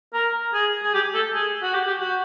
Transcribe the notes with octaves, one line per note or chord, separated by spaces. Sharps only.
A#4
G#4
G#4
G4
A4
G#4
F#4
G4
G4
F#4